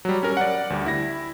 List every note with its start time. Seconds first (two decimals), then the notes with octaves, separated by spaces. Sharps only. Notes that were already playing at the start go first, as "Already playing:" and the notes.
0.05 F#3 G3
0.23 C#4 A#4
0.37 D5 F#5
0.70 D2 G3
0.86 E4 A#6